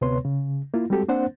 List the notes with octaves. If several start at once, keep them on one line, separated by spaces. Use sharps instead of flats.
D2 C3 B3 B4 C#5 C6
C#3
A#3 E4 F4
G3 G#3 C4 F#4 G4 A4
A#3 C4 D4 C5 F#5